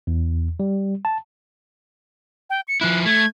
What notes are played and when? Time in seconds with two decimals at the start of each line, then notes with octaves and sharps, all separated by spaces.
0.07 E2
0.60 G3
1.05 A5
2.50 G5
2.68 C#7
2.81 F3 E4 F#6
3.06 A3 G#6